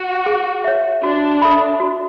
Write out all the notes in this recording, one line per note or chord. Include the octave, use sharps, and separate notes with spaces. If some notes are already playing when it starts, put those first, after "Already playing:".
Already playing: F#4
G#4
C#5 E5
D4 F#4
A4 E5 B5
F#4